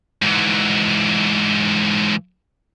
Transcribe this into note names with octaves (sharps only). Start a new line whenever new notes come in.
G#2 E3